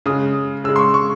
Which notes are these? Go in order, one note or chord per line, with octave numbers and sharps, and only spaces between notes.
C#3 G#3 D#6
C#3 G#3 E6
C6
C#6
C#6